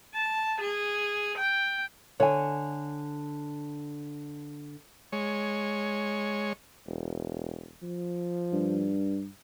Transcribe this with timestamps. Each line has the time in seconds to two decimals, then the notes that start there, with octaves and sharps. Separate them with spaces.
0.14 A5
0.61 G#4
1.38 G5
2.20 D3 C#5 G#5
5.12 G#3 C#5
6.87 E1
7.82 F3
8.53 G2